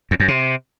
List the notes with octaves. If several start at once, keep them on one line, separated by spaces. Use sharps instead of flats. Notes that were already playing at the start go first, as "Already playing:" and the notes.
E2
F#2
C3